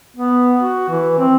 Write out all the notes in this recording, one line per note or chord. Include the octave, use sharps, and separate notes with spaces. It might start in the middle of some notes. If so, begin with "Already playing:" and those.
B3
F#4
E3
C4